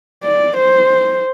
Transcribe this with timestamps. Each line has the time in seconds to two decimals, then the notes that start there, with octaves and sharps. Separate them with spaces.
0.23 D5
0.57 C5